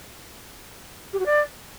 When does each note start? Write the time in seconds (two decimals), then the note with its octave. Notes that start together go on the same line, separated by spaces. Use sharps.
1.13 G4
1.19 F#4
1.25 D5